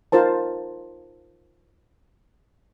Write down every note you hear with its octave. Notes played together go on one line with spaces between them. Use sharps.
D#4 F4 A#4 C5 A5